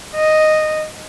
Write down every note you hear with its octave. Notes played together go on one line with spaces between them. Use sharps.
D#5